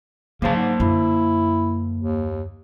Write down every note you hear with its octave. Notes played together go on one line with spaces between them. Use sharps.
C#3 F#3 A#3 C#4 C5 A5
G#2
F#2 D3 E4
D#2